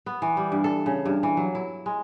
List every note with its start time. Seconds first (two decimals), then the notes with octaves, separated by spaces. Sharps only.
0.06 B3
0.22 E3
0.37 G3
0.52 G2
0.64 A4
0.86 C#3
1.06 G2
1.23 E3
1.37 F#3
1.55 E4
1.86 G#3